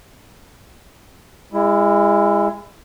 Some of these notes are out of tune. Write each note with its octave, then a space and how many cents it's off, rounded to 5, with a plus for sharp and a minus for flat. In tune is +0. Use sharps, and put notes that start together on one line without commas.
G#3 -30 E4 +15